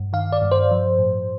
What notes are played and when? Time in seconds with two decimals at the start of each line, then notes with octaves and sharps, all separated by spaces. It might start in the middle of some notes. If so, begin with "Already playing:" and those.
Already playing: G2
0.13 D#3 F5
0.32 D5
0.42 G2
0.51 C5
0.71 F3
0.99 A2